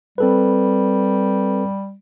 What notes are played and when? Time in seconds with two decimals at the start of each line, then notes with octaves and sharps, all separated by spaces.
0.18 G3 C4 A4 B4